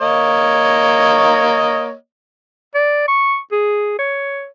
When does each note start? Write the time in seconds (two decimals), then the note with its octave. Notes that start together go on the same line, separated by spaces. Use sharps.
0.01 A#3 C#5 D#5
2.74 D5
3.08 C#6
3.52 G#4
3.99 C#5